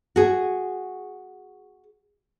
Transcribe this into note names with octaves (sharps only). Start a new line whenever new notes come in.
F#4 G#4